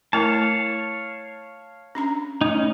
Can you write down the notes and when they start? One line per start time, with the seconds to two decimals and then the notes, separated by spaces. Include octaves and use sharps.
0.13 A3 E4 A#4 C#5 F5 A5
1.95 C#4 D4 A#5
2.41 A3 C#4 D#4